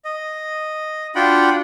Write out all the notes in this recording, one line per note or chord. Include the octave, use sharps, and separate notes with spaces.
D#5
D4 F4 F#4 F#5 G5 B5